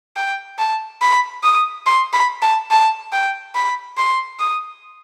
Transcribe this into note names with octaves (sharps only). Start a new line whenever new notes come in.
G5
A5
B5
D#6
C6
B5
A5
A5
G5
B5
C6
D#6